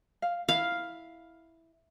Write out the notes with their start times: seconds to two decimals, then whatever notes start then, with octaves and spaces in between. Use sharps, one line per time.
0.22 F5
0.49 E4 F5